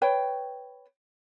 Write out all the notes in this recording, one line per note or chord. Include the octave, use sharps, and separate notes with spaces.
B4 C#5 G5